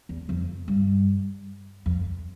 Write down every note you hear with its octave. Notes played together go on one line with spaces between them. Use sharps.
E2
F2
G2
F2